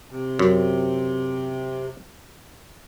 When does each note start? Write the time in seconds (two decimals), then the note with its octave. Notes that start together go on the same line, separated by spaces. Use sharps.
0.11 C3
0.39 F#2